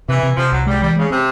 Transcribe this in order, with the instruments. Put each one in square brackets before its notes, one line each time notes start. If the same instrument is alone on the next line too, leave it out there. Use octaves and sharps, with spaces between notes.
[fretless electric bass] C3 [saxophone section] E3
[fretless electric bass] C3
[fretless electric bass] C3 [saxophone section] F3
[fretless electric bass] C2 [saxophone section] F#3
[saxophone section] G3 [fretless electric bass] G#3
[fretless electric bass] E3 [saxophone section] G3
[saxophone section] C#3 [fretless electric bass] G#3
[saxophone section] C3 [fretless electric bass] C4